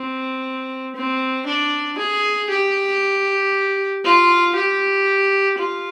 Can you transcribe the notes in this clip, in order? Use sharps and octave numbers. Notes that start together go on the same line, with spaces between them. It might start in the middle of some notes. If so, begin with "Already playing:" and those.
Already playing: C4
C4
D4
G#4
G4
F4
G4
F4